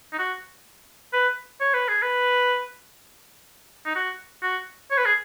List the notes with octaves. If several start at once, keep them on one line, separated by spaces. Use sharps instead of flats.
D#4
F#4
B4
C#5
B4
G#4
B4
D#4
F#4
F#4
C#5
B4
G#4